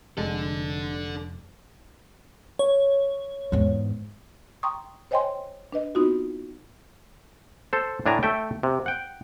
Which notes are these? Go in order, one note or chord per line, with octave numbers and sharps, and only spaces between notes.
F1 G#3 D4 A4
C#5
E2 G#2
G5 A#5 C6 C#6 D#6
C5 C#5 D#5 G5 G#5 C6
D4 B4 D#5
B3 C4 D#4 F4 F#4
A4 C5
A2 D4 G#5 A#5
A3 E5 G5
C3
F#5 G5